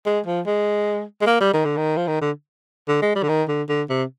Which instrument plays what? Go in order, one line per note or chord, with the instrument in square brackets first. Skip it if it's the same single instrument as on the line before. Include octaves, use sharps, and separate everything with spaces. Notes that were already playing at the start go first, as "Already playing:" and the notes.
[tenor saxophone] G#3
F3
G#3
G#3
A#3
G3
D#3
D3
D#3
F3
D#3
D3
D3
G#3
G3
D3
D#3
D3
D3
C3